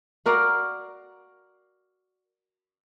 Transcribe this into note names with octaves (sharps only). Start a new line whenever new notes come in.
F#4 A#4 D5 F5